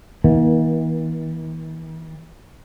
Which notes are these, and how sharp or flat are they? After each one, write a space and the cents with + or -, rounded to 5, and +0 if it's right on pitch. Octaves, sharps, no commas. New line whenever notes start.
E3 -45 A#3 +40